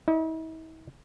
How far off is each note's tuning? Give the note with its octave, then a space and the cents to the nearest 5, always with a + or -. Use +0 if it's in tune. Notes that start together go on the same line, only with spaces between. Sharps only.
E4 -45 D#5 -40